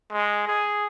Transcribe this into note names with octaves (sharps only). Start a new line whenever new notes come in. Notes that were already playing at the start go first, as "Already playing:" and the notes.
G#3
G#4